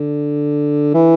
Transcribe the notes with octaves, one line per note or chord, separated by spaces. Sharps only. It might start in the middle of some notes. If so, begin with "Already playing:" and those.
Already playing: D3
E3